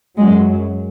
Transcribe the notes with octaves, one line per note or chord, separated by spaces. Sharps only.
F#2 F#3 G#3